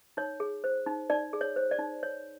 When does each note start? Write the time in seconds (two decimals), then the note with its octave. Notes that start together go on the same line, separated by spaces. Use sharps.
0.17 D#4 C#5
0.40 G#4
0.64 C5
0.86 D#4
1.10 D#4 D5
1.33 G#4
1.41 C#5
1.56 C5
1.71 D5
1.79 D#4
2.03 C#5